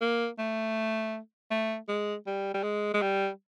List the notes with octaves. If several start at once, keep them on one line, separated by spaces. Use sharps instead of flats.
A#3
A3
A3
G#3
G3
G3
G#3
G#3
G3